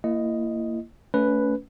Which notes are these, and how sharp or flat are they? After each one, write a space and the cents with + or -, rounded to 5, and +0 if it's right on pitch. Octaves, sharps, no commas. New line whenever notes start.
A#3 -20 E4 +25 D#5 +0
A3 +5 C#4 +30 B4 +0